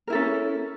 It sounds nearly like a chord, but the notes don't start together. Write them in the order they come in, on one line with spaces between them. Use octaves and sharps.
A#4 E4 A4 C#4